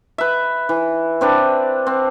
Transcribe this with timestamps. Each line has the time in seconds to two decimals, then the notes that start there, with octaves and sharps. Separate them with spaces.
0.18 B4 E5
0.69 E3
1.21 C4 D4 B4
1.87 C4